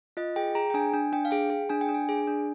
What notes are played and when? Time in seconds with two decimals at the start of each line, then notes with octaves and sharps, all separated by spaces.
0.17 F4 D#5
0.36 G#4 G5
0.55 G#4 A#5
0.70 G5
0.74 D4 G#5
0.94 D4 G#5
1.13 D4 G5
1.25 F5
1.31 G#4 G5
1.50 G#4
1.69 D4 G#5
1.81 G5
1.89 D4
1.94 G#5
2.09 G#4
2.27 D4